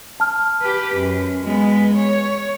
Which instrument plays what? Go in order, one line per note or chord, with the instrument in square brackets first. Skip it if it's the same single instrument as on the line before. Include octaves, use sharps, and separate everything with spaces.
[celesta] A5 F6
[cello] G4 B4
F#2
G#3 B3
C#5